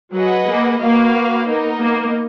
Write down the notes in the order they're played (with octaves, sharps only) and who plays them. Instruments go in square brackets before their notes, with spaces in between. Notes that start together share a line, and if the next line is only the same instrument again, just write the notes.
[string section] F#3 [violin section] G#4 B4 D#5 F#5
[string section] A#3
[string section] A#3 [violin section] F#4 B4 F5
[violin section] B3 D#4 A#4 D#5
[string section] A#3